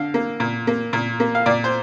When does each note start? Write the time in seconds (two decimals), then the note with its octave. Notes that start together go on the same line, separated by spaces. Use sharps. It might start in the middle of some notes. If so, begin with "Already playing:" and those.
Already playing: D3 F5
0.14 A#3
0.40 A#2
0.67 A#3
0.93 A#2
1.20 A#3
1.35 F5
1.46 A#2 D5
1.64 C5